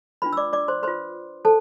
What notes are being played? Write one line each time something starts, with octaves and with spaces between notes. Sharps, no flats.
D4 F4 B4 B5
E6
D5 D6
D5 D6
C5 C6
F4 B4 C5 C6
A4 C5 A5